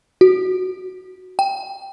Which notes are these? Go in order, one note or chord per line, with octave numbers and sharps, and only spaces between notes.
F#4
G5